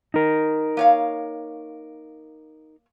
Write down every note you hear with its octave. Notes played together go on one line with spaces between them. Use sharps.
D#4 A#4
A#3 C#5 F5